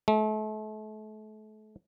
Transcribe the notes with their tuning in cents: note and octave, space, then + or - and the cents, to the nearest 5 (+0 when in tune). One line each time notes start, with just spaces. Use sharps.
A3 -35